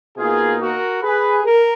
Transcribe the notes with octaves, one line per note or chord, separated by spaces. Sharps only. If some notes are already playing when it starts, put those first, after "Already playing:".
B2 A#3 D#4 F4 G#4
F#4 A#4
G#4 B4
A#4